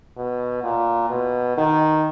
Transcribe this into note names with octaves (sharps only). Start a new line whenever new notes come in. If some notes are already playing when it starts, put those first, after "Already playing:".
B2
A#2
B2
D#3